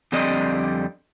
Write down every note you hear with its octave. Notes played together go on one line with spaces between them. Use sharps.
F2 D3 G3 C4 D5 D#5